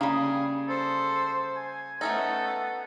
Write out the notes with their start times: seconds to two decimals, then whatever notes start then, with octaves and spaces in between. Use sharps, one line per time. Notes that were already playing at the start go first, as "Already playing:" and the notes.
0.01 C#3 G3 A#3 G#4
0.68 A4 C5
1.56 G#5
2.01 A3 B3 C#4 D#4 A4